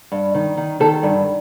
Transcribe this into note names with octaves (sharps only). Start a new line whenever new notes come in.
G2
D#3
D#3
D#3 A4
G2